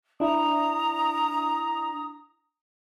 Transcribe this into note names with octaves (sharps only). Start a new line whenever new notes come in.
D4 E4 A#5 D#6